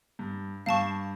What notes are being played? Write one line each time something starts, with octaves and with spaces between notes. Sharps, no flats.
G2
G2 F5 A5 C#6